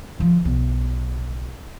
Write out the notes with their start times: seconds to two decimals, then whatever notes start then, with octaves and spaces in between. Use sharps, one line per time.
0.19 D3 F3
0.45 B1